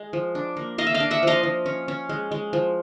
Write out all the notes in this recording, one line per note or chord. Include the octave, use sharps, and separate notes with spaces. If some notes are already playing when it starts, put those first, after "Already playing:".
Already playing: G#3
F3
D4
A#3
A#3 D#5 F5
E5
D#5 F5
D4
E5 F#5
F3 D#5 F5
F3
C#4
C#4
G#3
G#3
F3